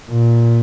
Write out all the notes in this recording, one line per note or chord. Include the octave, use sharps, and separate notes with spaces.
A#2